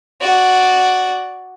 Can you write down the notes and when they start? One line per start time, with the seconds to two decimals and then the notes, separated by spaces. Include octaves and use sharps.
0.21 F#4 D5